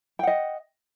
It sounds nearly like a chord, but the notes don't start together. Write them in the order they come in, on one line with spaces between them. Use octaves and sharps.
G5 F#5 D#5